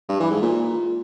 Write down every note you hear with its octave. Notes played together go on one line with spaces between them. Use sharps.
G2
E3
G#2
A#2